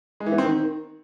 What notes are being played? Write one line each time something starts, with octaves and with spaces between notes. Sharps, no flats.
G#3
E3
B3
C4
D#3